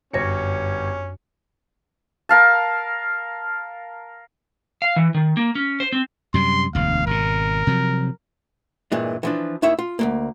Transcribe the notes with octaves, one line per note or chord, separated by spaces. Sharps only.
G1 F#2 C#4 C#5 A#6 C#7
A#4 F5 A5
F5
E3
D#3
A#3
C#4
C5
C4
F#2 C3 G3 C6
E1 D2 F5
G#1 B2 A#4
C3 F3 F#3
G2 A#2 E3 G#3
E3 F3 D4
D#2 D#3 E4 C#5 E5 B5
F4
D2 G#3 A#3